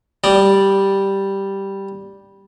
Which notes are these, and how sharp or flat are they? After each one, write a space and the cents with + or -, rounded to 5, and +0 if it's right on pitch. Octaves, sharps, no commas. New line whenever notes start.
G3 +0 D5 +0